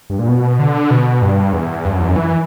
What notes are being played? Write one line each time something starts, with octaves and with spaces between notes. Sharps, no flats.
G2
A#2
B2
D3
B2
G2
E2
G2
F#2
E2
F#2
E3